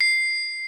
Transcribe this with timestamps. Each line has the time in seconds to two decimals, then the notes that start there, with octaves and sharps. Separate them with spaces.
0.01 C7